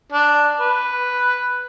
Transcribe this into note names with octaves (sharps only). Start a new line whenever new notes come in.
D4
B4